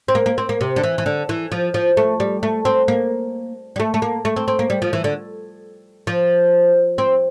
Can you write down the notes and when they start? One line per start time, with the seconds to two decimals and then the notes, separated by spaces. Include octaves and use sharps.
0.08 C4
0.15 A#3
0.26 A#3
0.38 C4
0.49 A#3
0.61 C3
0.76 D3
0.83 E3
0.98 E3
1.06 D3
1.29 E3
1.52 F3
1.74 F3
1.97 A3
2.20 G3
2.43 A3
2.65 C4
2.88 A#3
3.76 G3
3.80 A3
3.94 A3
4.02 A#3
4.25 A3
4.36 C4
4.48 C4
4.59 A#3
4.70 G3
4.82 F3
4.93 E3
5.04 D3
6.07 F3
6.98 C4